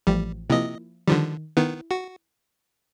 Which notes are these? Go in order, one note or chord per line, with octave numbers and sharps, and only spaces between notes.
A1 F3 G3 G4
C3 F3 A#3 E4 D#5
D3 D#3 F3 G3
D#3 B3 E4
F#4